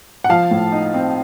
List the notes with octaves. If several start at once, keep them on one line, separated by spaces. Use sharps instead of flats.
F#5
F3 F5 A5
A2
D#4
C4